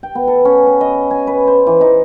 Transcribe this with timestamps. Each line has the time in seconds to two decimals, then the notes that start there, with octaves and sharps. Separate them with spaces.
0.03 G5
0.15 B3
0.27 A4
0.45 C#4
0.67 B4
0.81 D#5
1.11 G#5
1.27 B4
1.47 C5
1.67 E3
1.81 D#4